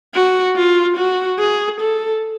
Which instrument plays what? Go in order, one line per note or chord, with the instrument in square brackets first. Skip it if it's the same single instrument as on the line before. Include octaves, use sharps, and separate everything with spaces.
[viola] F#4
F4
F#4
G#4
A4